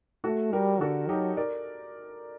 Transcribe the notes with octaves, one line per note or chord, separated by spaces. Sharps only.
A3 F#4 A4
G3 G4 A#4
D3 F#4 A4
F#3 D#4 G4
A#4 D5